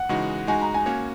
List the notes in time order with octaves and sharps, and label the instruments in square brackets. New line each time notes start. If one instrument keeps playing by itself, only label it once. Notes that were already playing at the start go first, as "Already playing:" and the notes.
Already playing: [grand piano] F#5
[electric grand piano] C#3 E3 G#3 D#4 F#4
[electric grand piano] G#3 D#4 F#4 [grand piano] G#5
[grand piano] A#5
G#5
[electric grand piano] A#3 C#4 F#4 C#5